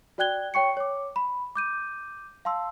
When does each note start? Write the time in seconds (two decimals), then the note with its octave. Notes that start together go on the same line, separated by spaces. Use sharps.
0.18 F#4 D5 G5 F#6 G#6 G7
0.54 C#5 G5 C#6 C#7
0.77 C#5 D6
1.16 B5
1.56 D6 G6 D#7
2.45 F5 A5 C6 E6